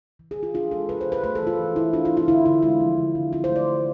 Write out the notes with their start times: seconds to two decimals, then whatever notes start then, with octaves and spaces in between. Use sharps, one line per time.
0.19 E3
0.31 G#4
0.37 E3
0.43 F4
0.54 D4 F4
0.71 G#3 A4
0.89 C3 B4
1.01 C5
1.07 C3
1.12 B4
1.24 A3 B4
1.35 A4
1.42 E3
1.47 F4
1.59 E3
1.76 E3 E4
1.93 D4 F4
2.05 F4
2.11 B3
2.17 F4
2.28 D3 E4
2.46 D3 E4
2.62 G#3 F4
2.81 F3
2.98 D3
3.15 D3
3.33 C4 F4
3.44 C5
3.50 A3
3.56 D5
3.68 E4